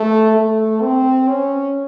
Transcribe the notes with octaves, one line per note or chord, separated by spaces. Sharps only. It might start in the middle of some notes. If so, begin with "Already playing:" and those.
Already playing: A3
A3
C4
C#4